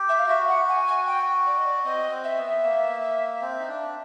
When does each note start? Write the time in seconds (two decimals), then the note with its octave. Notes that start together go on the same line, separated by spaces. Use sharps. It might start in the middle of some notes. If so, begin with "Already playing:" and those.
Already playing: G4
0.08 E5
0.19 F5
0.28 F#4 E5
0.48 F#5
0.68 G#5
0.86 G#5
1.06 G5
1.46 D5
1.57 D#5
1.66 D5
1.84 C4 D#5
2.11 C4
2.23 E5
2.37 B3
2.63 A#3
3.41 C4
3.60 D#4
3.68 D4